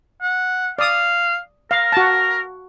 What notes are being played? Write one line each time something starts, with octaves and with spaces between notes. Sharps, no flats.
F#5
D5 F5 D#6
A#4 F5
F#4 A5